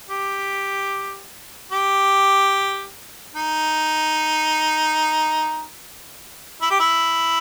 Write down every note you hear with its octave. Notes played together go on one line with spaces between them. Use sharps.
G4
G4
D#4
E4
G4
E4